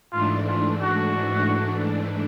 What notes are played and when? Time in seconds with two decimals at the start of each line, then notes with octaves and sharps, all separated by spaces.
0.12 G#2 E3 A3 D4 F4
0.48 F4
0.82 F#4